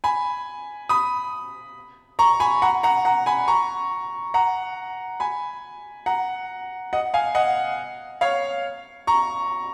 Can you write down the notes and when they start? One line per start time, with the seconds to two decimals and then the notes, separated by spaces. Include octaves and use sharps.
0.04 G#5 B5
0.89 B5 D#6
2.19 A#5 C#6
2.40 G#5 B5
2.62 F#5 A#5
2.83 F#5 A#5
3.05 F#5 A#5
3.26 G#5 B5
3.48 A#5 C#6
4.34 F#5 A#5
5.20 G#5 B5
6.06 F#5 A#5
6.93 D#5 F#5
7.14 F5 G#5
7.35 D#5 F#5
8.21 C#5 F5
9.07 A#5 C#6